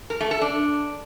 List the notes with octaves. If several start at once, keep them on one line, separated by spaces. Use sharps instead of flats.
A#4
A3
A4
D4